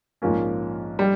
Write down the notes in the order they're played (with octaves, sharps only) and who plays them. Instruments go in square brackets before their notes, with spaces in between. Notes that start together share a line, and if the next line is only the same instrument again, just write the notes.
[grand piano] A#1 G#2 F3 A#3 C#4
[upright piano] G3